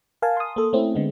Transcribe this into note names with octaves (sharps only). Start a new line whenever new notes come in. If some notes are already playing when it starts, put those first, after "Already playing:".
A#4 F5 G#5 A5
C6 D#6
A#3 A4
A3 C4 C#4 E4
D3 G#3 B3